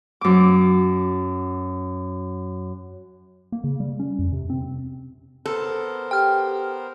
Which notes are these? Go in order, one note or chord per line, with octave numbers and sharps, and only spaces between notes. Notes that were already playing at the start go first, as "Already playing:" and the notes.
F#2 D6
A#3
C#3
G3
C#4
F2
C3
C4
B3 A4 A#4 C5
G4 G5 F6